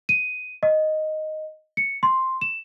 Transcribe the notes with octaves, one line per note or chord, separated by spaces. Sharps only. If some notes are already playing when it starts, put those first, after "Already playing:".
D#7
D#5
C#7
C6
E7